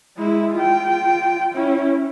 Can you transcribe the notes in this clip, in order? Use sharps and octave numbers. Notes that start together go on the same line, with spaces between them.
G#3 E4
F4 G5
C#4 E4